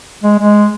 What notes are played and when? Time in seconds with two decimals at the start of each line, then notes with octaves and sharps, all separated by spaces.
0.23 G#3
0.39 G#3